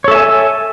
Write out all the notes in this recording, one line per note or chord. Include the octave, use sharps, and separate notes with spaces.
A4 C#5 E5 G#5